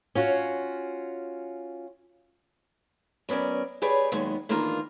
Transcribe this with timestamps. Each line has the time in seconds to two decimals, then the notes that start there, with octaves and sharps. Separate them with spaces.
0.15 C#4 F4 F#4
3.29 F#3 B3 C#4 A#4 D5
3.82 G4 G#4 B4 C#5 D5
4.12 D#2 D#3 F#3 G#3 B3
4.49 D#3 E3 A#3 D4 F4 A#4